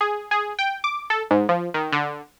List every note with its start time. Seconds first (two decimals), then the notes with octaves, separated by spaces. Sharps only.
0.01 G#4
0.31 G#4
0.59 G5
0.84 D6
1.10 A4
1.31 G#2
1.49 F3
1.74 D#3
1.92 D3